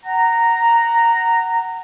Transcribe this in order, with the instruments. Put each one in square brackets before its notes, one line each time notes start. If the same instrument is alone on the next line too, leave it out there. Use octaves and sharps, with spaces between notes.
[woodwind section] F#5 A#5